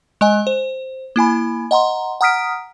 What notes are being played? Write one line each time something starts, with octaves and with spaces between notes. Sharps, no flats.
G#3 D#5 G#5
C5
A#3 E4 G#5 B5
D#5 F#5 A#5 C6
F#5 A#5 D#6 F6 B6 D7